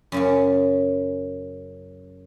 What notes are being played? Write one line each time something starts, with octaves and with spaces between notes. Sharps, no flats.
F#2 C#3 F#3